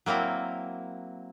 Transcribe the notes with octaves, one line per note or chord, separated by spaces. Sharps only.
F#3 A#3 C4 E4